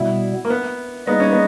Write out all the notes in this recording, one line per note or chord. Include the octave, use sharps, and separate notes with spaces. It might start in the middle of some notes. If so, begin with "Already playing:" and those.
Already playing: B2 G3 B3 E4
A#3
B3
G3 A#3 B3 D#4 G#4 D#5
C#4
B3